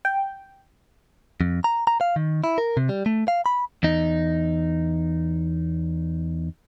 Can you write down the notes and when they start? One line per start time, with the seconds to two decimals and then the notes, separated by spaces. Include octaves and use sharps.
0.05 G5
1.41 F2
1.64 A#5
1.87 A#5
2.01 F5
2.16 D#3
2.44 E4
2.58 A#4
2.77 C3
2.89 G3
3.06 A3
3.28 F5
3.46 B5
3.83 E2 D#4